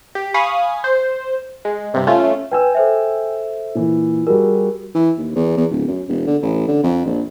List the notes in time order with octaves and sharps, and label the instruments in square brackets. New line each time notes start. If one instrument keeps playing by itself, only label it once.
[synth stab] G4
F5 G#5 B5 C#6 D#6
C5
G#3
G2 C3
A3 C#4 F4
[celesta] B4 [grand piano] G5 G#5 E6
[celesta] A4 C5 E5
[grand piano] A#2 E3
[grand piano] G3 F#4 G#4 [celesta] A#4
[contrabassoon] E3
D#2
E2
E2
D1
F#2
E1
D3
A1
D3
F2
A#1